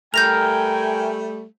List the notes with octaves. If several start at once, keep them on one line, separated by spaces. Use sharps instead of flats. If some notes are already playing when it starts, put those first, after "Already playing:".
G3 A3 A#4 G5 G#5 G6 A#6 F7